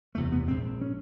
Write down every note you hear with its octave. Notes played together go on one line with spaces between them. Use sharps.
F#1 E2 C3 A3
B3
A#1 G#2 C4
C#4